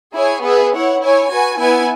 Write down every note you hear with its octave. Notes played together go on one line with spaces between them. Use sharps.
E4 G#4 C#5 G#5
B3 G#4 B4 E5
E4 C#5 F#5
E4 C#5 G#5
F#4 B4 G#5
B3 E4 B4 G#5